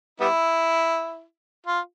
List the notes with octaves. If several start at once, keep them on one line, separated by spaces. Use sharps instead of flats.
G3 B3 E4
F4